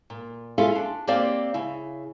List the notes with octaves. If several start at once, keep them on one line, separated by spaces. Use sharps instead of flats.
A#2
C#4 E4 F4 G#4 A4 F5
D4
A#3 C4 G4 C5 D5 F5
C#3 E4